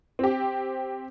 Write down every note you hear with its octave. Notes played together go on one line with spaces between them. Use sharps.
C4 G4